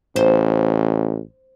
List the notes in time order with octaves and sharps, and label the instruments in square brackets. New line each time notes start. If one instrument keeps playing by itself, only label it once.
[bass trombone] A1 [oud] C5